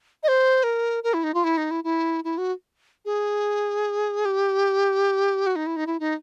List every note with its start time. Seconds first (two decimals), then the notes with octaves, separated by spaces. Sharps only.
0.23 D#5
0.28 C5
0.63 A#4
1.04 A#4
1.14 E4
1.24 D#4
1.34 F4
1.44 E4
1.57 D#4
1.71 E4
1.84 E4
2.24 E4
2.38 F#4
3.05 G#4
4.25 G4
5.46 F#4
5.56 D#4
5.67 E4
5.76 D#4
5.87 E4
6.00 D#4